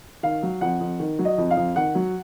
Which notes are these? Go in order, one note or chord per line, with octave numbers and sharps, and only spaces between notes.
D#3 F5
F#3
F2 F#5
F2
D#3
F#3
D#5
F2
F5
F2
D#3 F#5
F#3